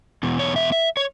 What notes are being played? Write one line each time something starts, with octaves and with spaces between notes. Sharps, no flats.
E2 B2
C#5
E5
E5
C#5